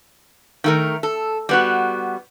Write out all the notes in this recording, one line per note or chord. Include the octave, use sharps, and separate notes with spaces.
D#3 A3 A#4
A4
G3 B3 F#4